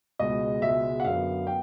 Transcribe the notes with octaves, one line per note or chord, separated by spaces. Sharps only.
C#2 B2 G#3 D#5
C#2 B2 G#3 E5
F#5
F#2 D3 F#3 B3 F5
B3 G5